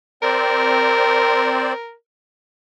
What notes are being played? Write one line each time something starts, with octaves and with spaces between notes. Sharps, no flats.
C4 A#4 C5 D5